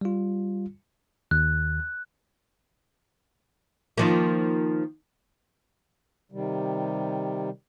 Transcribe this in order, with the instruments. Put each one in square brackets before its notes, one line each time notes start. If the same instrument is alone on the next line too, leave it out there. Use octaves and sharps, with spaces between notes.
[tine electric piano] G3 F4
[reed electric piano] D#2 [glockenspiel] F#6
[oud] D#3 F3 A#3
[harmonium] C3 D#3 G3